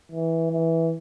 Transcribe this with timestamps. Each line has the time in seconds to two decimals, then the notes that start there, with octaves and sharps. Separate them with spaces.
0.12 E3
0.53 E3